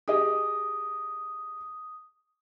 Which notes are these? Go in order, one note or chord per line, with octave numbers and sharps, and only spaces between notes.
G4 G#4 D#5 D#6